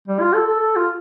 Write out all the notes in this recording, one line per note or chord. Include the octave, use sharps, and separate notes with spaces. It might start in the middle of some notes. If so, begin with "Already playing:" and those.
G3
F4
A4
A4
A4
F4